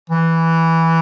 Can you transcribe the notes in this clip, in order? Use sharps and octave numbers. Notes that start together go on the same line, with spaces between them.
E3